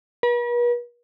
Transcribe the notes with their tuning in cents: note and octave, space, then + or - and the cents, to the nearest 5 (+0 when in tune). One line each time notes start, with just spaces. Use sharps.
B4 -45